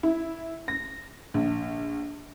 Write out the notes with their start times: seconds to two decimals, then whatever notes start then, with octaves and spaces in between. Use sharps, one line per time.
0.03 E4
0.68 A#6
1.34 A#1